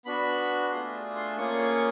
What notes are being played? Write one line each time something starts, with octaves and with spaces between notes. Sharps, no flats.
B3 D4 F#4 B5
A3 D4 F4 G#4 C6
C6
A#3 C#4 F4 G#4 C#6
C#6